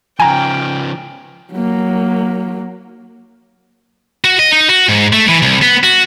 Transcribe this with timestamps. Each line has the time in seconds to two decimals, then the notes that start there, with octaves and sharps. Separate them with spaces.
0.20 C#3 F3 G5 G#5 A#5
1.52 F#3 A#3
4.24 F#4
4.39 D#5
4.51 D#4
4.69 F#4
4.89 G#2
5.13 A3
5.29 E3
5.42 C2
5.62 B3
5.84 F#4